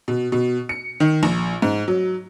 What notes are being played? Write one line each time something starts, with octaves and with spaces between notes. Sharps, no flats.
B2
B2
C#7
D#3
A#1
G#2
F#3